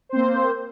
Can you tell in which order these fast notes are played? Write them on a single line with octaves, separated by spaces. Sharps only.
C5 C4 A#3